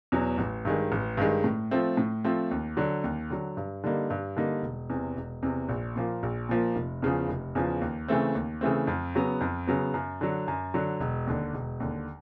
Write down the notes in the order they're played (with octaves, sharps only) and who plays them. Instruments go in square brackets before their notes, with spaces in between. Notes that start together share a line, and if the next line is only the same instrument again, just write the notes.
[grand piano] E2 B2 F#3
A1
G2 D#3 G#3
A1
G2 D#3 G#3
A2
F3 A3 C4
A2
F3 A3 C4
D#2
D3 F#3
D#2
D3 F#3
G2
D3 G3 A#3 D#4
G2
D3 G3 A#3 D#4
E1
E2 C3
E1
E2 C3
A#1
A#2 F3 A#3
A#1
A#2 F3 A#3
F1
E2 C#3 F3
F1
E2 C#3 F3
D#2
C#3 E3 A3 C4
D#2
C#3 E3 A3 C4
F2
C#3 F#3 B3
F2
C#3 F#3 B3
F#2
D3 F#3
F#2
D3 F#3
E1
D#2 D3
E1
D#2 D3